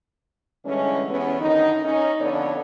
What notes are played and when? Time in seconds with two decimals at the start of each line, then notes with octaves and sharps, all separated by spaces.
0.64 D3 E3 G3 G#3 C#4
1.09 E2 E3 B3 C#4
1.40 F#2 D3 D#3 D#4
1.83 C#4 D#4
2.19 F2 D3 B3 C#5 D5